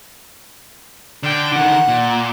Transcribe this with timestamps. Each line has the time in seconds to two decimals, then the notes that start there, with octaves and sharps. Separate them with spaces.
1.23 D3 G5
1.52 D3 D#3 F#5
1.88 A#2